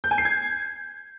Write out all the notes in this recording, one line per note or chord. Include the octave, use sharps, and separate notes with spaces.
G6
G#5
C7
G#6